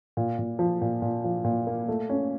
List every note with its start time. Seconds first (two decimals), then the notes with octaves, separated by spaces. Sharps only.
0.17 A#2
0.39 A#2
0.59 F3
0.81 A#2
1.02 A#2
1.24 F3
1.44 A#2
1.67 A#3
1.88 A3
2.09 C#4